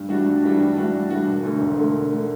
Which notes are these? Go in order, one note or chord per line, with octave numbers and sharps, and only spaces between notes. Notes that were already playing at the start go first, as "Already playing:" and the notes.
Already playing: G2
E3 G3 D4 F#4
G2
E3 G3 D4 F#4
G2
E3 G3 D4 F#4
G2
E3 G3 D4 F#4
E1
D2 D3 A3
E1
D2 D3 A3
E1
D3 A3